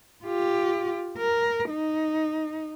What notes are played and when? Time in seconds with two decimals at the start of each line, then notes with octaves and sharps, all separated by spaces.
0.25 F4 G4
1.18 A#4
1.70 D#4